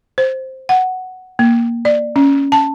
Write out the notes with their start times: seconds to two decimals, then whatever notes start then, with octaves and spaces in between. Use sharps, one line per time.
0.18 C5
0.69 F#5
1.39 A#3
1.85 D5
2.16 C#4
2.52 A5